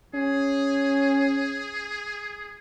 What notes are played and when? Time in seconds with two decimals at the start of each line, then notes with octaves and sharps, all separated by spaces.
0.14 C#4 G#4